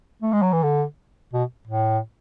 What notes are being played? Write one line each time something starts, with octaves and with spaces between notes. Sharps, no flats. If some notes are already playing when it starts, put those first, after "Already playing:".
A3
G#3
F#3
E3
D3
B2
A2